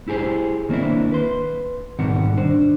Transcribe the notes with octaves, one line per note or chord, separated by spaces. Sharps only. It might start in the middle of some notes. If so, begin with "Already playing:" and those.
E4 G4 G#4 A#4 C5
D#3 A#3 C4 D4 E4
B4 C6
B1 G#2 D#3 G3 C4 F#5
D4 C5